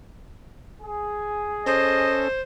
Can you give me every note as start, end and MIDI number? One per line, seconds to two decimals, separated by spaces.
0.82 2.11 68
1.66 2.28 61
1.66 2.28 69
1.66 2.41 72
1.66 2.28 75